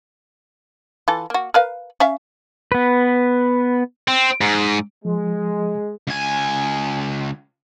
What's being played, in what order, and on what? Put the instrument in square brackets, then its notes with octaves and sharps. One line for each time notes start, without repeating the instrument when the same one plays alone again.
[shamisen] E3 F4 A4
A#3 F#4
A#4 B4 F5
C#4 E5 F5
[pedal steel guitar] B3 B4
[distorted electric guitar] C4
G#2
[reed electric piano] F3 [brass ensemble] G#3
[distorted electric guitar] C#2 G#5